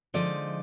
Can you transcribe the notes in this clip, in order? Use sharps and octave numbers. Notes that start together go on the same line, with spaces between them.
D3 F3 G#3 D#4 D5